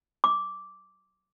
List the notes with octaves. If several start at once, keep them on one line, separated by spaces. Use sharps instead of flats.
D6